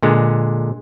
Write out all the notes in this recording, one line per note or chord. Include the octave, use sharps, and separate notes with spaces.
A#2 D3 G#3